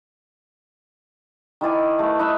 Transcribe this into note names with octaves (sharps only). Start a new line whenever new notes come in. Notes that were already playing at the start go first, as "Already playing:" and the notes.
D#3 E4 D5 G#5
A3 B4
D#4 B4 E5